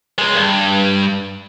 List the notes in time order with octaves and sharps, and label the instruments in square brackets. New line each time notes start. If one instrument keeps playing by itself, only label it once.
[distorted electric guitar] C#2 G#3
G2